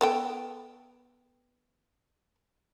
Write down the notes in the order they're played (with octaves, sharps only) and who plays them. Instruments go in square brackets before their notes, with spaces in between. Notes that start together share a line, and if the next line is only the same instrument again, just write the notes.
[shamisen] B3 A4 G5